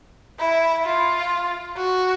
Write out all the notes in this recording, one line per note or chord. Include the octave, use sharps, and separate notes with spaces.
E4
F4
F#4